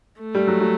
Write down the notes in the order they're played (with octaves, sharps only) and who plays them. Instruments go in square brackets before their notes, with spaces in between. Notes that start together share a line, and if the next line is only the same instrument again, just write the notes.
[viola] A3
[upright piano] G3
F#3
F#3